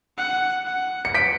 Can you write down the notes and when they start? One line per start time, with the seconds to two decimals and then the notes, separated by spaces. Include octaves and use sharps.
0.18 F#5
0.66 F#5
1.05 C#7
1.14 B6 D7